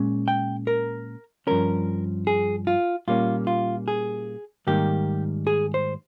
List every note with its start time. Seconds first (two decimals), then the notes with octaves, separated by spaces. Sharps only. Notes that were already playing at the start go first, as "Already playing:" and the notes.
Already playing: A#2 G#3 C#4
0.28 G5
0.67 A#4
1.47 G2 F3 A#3 C#4 A#4
2.27 G#4
2.67 F4
3.08 A#2 G3 A#3 C#4 F4
3.47 F4
3.88 G#4
4.67 G#2 D#3 G3 A#3 G4
5.47 G#4
5.74 C5